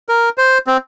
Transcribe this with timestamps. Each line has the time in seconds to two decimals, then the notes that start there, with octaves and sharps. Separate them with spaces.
0.09 A#4
0.38 C5
0.67 C4